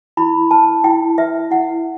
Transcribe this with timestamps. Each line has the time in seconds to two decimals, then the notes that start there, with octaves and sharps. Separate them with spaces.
0.17 E4 B5
0.51 B4 A5
0.84 E4 G5
1.18 B4 E5
1.51 E4 F#5